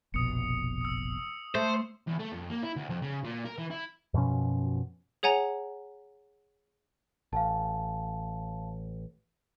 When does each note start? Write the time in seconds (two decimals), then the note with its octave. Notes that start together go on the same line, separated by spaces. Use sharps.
0.14 F1 A#1 B2 D#6 C#7
0.81 D#6 E6
1.55 A3 C5
2.07 E2
2.19 A3
2.32 F2
2.50 A#3
2.63 E4
2.76 D2
2.90 F2
3.02 C#3
3.24 A#2
3.45 A#4
3.58 E3
3.70 E4
4.14 F#2 B2 F3 C#4
5.23 G#4 C#5 F#5 G#5 A#5
7.33 A1 F5 A5